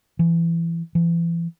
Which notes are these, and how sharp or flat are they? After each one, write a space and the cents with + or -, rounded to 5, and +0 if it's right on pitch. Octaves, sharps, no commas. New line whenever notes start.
E3 +25
E3 +35